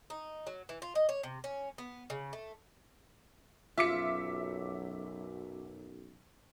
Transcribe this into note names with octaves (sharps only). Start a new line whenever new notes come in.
D#4
F#3
E3
F4
D#5
C#5
C3
C#4
B3
C#3
A3
B1 F#2 F4 E5 D6 C#7